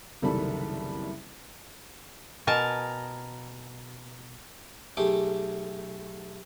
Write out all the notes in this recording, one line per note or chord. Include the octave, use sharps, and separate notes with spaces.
F#1 C2 D#3 G3 A4 B5
B2 A#4 G#5 A5
B1 A3 G4 G#4 D6